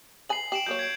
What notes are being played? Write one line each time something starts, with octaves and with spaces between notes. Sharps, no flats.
B4 G#5 B5 C7 F#7
G4 D7 E7 F#7
F#3 A#3 C#5 G6
G#6 C7 D7